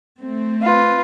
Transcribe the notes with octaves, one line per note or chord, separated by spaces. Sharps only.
A3 C4
F4 B4